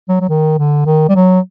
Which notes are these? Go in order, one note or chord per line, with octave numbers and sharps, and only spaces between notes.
F#3
F#3
D#3
D3
D#3
G3
F#3